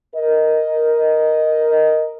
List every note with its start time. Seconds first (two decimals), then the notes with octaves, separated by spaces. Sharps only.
0.15 A#4 D#5